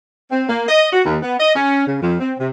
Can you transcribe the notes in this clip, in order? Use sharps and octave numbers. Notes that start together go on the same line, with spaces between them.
C4
A#3
D#5
F#4
D#2
B3
D#5
C#4
C#3
F2
C4
C3